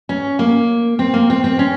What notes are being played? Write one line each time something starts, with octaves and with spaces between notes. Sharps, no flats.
C#4
A#3
C4
A#3
C4
C4
C#4